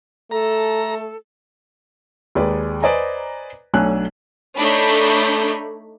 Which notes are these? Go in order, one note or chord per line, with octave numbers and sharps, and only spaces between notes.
A3 A4 A#5
D#2 G#3 B4 D5
B4 C5 D5 D#5 G#5 A#5
B1 A3 D4 C#5 G#5 F#6
A3 D4 D#4 C#5 B5 G6